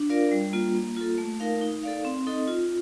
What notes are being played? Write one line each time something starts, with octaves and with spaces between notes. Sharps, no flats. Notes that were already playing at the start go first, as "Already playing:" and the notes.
Already playing: D4
F4 A#4 D5 F5
G3
A#3 F4
A#3
F4 A4
A3
D#4 A#4 F5
D#4
A4 D5 F5
C4
D#4 A4 D#5
F4